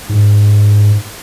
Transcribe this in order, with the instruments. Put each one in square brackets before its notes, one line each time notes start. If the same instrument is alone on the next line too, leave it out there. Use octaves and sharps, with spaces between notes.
[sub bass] G#2